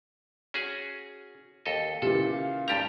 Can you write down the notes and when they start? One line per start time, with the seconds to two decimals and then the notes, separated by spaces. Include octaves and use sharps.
0.54 C#4 F#4 G#4
1.66 D#2 A4 D#5
2.02 A#2 C#3 E3 G4 A4
2.32 F5
2.68 G2 G4 A#5 G6 A6